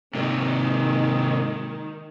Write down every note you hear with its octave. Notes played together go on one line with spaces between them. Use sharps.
G#2 C3 D#3